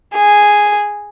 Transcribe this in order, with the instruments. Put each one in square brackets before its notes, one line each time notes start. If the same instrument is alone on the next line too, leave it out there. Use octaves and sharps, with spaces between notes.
[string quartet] G#4